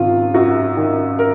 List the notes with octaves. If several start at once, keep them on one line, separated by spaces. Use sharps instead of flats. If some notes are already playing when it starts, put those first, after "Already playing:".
Already playing: G#1 F#2 F4
F#2 F#4
D#3
A#4